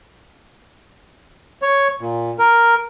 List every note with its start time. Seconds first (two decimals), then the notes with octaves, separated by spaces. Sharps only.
1.62 C#5
2.01 A#2
2.39 A#4